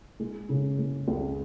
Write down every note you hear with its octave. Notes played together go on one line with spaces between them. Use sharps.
G#3
C#3
G#3
C#2